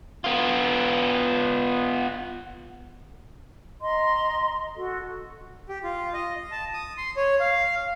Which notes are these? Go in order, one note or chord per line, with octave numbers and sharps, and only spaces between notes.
B3 F4
D#5 A#5 C6
F#4 A4
G4
F4
D#5
D#5
A5
D#6
C6
C#5
F5